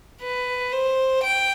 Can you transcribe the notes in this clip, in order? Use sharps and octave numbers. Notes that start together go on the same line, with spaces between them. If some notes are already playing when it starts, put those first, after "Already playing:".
B4
C5
G5